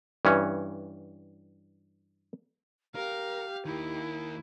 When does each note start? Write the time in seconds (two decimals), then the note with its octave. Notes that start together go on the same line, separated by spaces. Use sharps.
0.25 G2 E3 C#4
2.95 G4 A#4 F5
3.66 D#3 A#3 E4